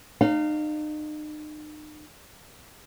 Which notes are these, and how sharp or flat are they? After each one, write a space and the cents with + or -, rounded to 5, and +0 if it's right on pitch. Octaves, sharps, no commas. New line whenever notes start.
D#4 -40 F5 +0